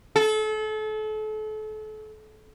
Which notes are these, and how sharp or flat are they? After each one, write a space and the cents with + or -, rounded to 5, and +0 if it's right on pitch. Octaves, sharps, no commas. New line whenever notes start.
A4 -35